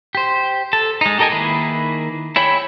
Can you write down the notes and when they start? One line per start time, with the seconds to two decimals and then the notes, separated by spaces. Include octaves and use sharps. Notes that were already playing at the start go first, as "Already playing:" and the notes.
0.15 G4 C5
0.73 A4 A5
1.01 G#3 D#4
1.19 G4 A4 A#4 D#5 G#5
1.32 D#3 A#3 E4 G#4 B4
2.36 E4 G#4 C#5 G5 B5